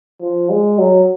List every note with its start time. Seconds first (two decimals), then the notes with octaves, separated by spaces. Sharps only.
0.22 F3
0.50 G#3
0.79 F#3